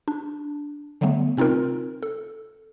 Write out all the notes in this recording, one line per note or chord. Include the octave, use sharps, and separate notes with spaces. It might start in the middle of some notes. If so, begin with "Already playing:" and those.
D4
D3 F#3 G3 A3 B3
C3 C4 D#4 F4 A#4
A4